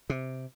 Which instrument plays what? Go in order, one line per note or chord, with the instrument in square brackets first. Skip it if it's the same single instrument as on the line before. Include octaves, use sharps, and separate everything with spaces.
[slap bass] C3